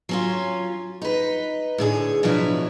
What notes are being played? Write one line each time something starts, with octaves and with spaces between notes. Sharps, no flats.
F#3 C#4 F4
D#4 B4
A2 D3 G#4
B2 F3 F#3 D4 E4